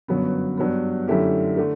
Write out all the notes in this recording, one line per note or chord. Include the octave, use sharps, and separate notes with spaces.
G1 F#2 F#3 B3
G2 F#3 B3
F#2 D3 A3 E4 G4
D3 A3